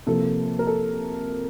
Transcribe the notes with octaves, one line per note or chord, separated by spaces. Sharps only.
C3 F3 A#3 A4
A#4
A4